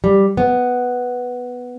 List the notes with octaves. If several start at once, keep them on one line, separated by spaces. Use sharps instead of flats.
G3
B3